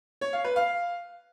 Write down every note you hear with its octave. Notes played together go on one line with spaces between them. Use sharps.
C#5
F5
B4
F5